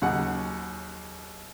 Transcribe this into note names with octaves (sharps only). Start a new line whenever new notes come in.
D#2 C#3 F#3 C#4 F#5